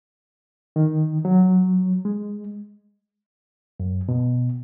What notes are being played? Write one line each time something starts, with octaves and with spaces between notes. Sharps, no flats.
D#3
F#3
G#3
F#2
B2